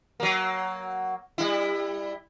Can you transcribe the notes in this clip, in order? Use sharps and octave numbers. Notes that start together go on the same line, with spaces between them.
F#3 A#3
G3 E4